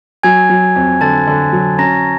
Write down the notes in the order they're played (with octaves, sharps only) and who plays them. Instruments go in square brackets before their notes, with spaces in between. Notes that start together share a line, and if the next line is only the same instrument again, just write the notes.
[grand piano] F#3 [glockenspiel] G#5 G#6
[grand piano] F#3
F2
[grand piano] D3 [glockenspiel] A5 A6
[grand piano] D3
F#3
[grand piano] C#4 [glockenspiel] A#5 A#6